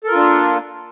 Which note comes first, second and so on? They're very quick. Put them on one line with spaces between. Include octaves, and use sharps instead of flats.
A4 A#4 F4 D4 A#3